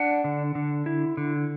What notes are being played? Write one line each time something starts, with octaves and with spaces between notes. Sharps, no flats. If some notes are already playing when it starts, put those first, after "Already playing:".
Already playing: D4 F#5
D3
D3
E4
D3